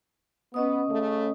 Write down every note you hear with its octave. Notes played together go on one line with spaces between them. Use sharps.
B3 C#4 B4 D#5 D#6
C#3 A3